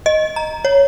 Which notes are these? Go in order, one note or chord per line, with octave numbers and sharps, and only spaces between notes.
D#5
A#5
C#5